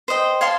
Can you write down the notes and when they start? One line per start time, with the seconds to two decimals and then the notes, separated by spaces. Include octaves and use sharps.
0.08 C5 D#5 G5
0.41 C#5 F5 A5 C6